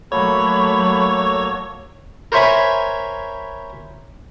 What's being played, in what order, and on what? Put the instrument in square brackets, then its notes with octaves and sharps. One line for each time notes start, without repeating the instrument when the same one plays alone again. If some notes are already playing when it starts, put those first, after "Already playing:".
[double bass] F#3 A3 [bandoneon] A#3 F#4 A4 [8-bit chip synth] C#5 [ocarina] B5
[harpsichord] A#4 C5 C#5 E5 G#5 B5